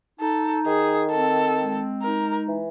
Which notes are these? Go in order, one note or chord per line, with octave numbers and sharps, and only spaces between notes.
D#4 A4
D#3 G#4
C4 A4
G#3
D#4 A#4
E3